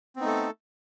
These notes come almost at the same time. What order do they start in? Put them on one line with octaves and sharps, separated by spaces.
C4 B3 D#4 A3 A4